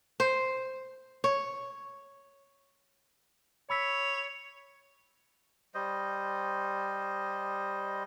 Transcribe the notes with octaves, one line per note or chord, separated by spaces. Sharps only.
C5
C#5
C#5 B5 E6 B6
G3 C5 D#5